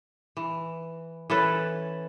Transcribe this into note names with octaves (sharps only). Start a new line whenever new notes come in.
E3
E3 C#4 A4 B4